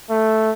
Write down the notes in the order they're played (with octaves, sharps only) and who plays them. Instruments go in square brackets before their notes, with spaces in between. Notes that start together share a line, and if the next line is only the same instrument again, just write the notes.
[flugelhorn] A3